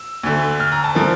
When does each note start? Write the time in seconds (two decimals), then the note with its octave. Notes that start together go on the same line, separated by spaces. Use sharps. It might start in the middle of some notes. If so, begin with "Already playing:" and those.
Already playing: E6
0.23 D2 D3 A3
0.60 F6
0.72 A#5
0.84 A5
0.95 D3 F3 A3 A#4